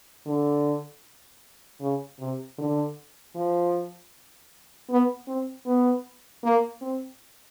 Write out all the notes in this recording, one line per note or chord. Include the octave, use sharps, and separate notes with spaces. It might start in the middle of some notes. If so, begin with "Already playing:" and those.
D3
C#3
C3
D3
F3
B3
C4
B3
A#3
C4